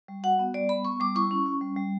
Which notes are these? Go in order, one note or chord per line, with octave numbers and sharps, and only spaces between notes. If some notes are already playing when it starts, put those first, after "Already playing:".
G3
F#4 F#5
B3
G3 D5
B3 B5
B3 C#6
G3 D6
E4 C#6
C#4
C#4
G3
G3